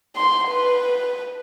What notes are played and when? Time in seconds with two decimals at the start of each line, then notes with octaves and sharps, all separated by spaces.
0.16 C6
0.49 B4